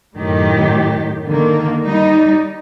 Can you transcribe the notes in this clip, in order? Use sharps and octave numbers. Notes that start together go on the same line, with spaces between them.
F#2 A2 D#3 G4
D3 D#3 A#3
G3 D#4